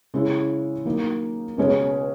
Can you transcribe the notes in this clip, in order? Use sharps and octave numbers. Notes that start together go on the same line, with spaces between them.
C#3 G#3 C#4 E4
D#3 F#3 A#3 D#4 A#4
C#2 B2 G#3 C#4 G#4